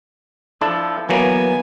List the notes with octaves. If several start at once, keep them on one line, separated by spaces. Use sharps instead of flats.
F3 D4 E4 A4
E3 F#3 A#3 B3 G#5